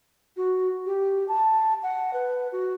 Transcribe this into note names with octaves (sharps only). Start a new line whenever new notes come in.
F#4
G4
A5
F#5
B4
F#4